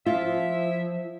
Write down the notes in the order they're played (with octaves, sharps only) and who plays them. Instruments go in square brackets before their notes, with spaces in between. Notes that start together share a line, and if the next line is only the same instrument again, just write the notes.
[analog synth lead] F3 [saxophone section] E4 E5 [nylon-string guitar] F4